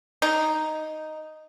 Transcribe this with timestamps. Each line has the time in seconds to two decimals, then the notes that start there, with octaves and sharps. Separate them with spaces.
0.22 D#4